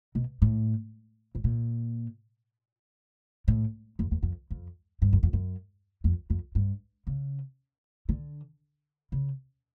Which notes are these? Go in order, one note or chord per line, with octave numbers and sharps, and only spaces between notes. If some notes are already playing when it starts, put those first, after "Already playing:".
B2
A2
A2
A#2
A2
F2
E2
F2
F2
G2
F#2
F2
F#2
F2
F2
G2
C#3
D3
C#3